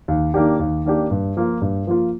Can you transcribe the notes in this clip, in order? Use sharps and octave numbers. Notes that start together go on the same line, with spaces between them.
D#2
D#3 A#3 D4 G4
D#2
D#3 A#3 D4 G4
G2
F3 A#3 F4
G2
F3 A#3 F4